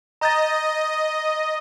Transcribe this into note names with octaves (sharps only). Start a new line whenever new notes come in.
D#5 A#5 G6 A6